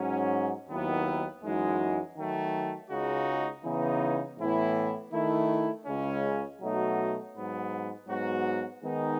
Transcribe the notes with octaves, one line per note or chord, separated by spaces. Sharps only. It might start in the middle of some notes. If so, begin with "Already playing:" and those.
Already playing: G#2 F#3 C#4
D#2 D#3 F#3 B3 E4
F#2 E3 G#3 D#4 F#4
D#3 F#3 A3
C#2 C#3 G#3 D#4 F#4
C#3 E3 B3 D#4
A2 E3 B3 E4
D#3 A3 E4
C#2 C#3 G#3 C#4
B2 F#3 A3 D#4 F#4
G#2 F#3 B3
G#2 F#3 B3 F#4
D#3 G#3 B3 D#4